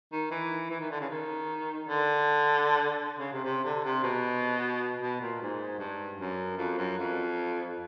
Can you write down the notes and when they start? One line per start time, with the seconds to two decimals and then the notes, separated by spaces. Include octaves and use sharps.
0.12 D#3
0.31 E3
0.70 E3
0.80 D#3
0.91 D3
1.00 C#3
1.09 D#3
1.89 D3
3.19 C#3
3.32 C3
3.45 C3
3.64 D3
3.84 C3
4.03 B2
5.02 B2
5.21 A#2
5.41 G#2
5.79 G2
6.19 F#2
6.58 F2
6.78 F#2
6.98 F2